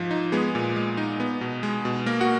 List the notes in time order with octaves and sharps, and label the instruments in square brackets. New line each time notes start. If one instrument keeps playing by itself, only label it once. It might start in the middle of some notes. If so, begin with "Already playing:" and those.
Already playing: [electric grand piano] G#2 F3
D#4
G#3 B3 G#4
A#2
G#3
D#4
B3
B2
G#3
B2
A#3 A#4
F#4 F#5